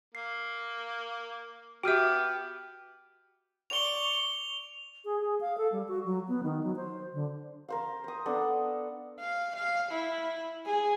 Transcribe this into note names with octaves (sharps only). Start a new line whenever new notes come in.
A#3 C7
B3 F#4 G4 E5 G5 D6 F6 G6
D5 C#6 F7 G7
G#4
G#4
F5
A4
G3
F#4
F#3
B3
D#3
F#3
C5
D3
A#4 C5 F5
C5 D#6
B3 D4 A4
F5
F5
E4
G#4